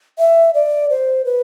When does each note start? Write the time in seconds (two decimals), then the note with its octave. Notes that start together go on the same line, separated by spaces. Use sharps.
0.19 E5
0.54 D5
0.90 C5
1.25 B4